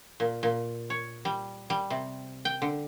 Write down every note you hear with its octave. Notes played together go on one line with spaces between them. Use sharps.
A#2
A#2
C#5
G3
G3
C3
G5
D3